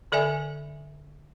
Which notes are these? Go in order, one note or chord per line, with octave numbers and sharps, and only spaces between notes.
D3 A4 D5 E5 G#5